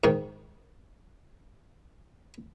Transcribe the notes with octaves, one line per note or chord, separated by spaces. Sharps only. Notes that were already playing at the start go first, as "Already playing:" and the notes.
G#2 D#3